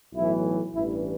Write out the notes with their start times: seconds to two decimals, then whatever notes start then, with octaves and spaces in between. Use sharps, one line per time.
0.15 B1 A2 E3 E4
0.74 A1 G2 E3 E4